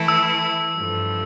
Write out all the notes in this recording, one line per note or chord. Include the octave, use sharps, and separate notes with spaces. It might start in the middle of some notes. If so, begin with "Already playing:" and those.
Already playing: E3 A3 E4
E6
G2 F3 A3